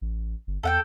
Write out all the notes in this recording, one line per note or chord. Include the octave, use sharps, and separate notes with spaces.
A1
G1
E2 A4 F#5 G5